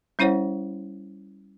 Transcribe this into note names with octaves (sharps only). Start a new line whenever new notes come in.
G3 C#4 E4 C5 C#5 F#5